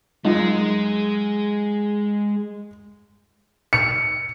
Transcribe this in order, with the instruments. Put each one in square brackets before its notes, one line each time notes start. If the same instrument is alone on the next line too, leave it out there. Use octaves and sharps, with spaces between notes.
[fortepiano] F#2 D#4 F4 [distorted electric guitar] G#3
[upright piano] C#7